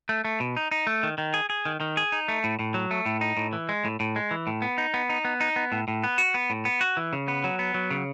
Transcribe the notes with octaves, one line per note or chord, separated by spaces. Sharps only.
A3
A3
B2
D#4
D#4
A3
D#3
D#3
G#4
G#4
D#3
D#3
G#4
D#4
A3
A2
A2
F#3
A3
A2
D#4
A2
E3
G#3
A2
A2
G#3
E3
A2
B3
D#4
B3
D#4
B3
D#4
B3
A2
A2
B3
F#4
B3
A2
B3
F#4
E3
C#3
B3
F#3
B3
F#3
C#3